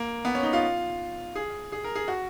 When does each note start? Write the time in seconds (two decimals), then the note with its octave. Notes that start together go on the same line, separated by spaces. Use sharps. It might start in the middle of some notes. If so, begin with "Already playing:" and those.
Already playing: A#3
0.25 B3
0.35 C#4
0.43 D#4
0.53 F4
1.36 G#4
1.72 G#4
1.84 A#4
1.95 G#4
2.08 F#4